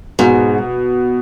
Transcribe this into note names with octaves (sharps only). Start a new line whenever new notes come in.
G#2 B2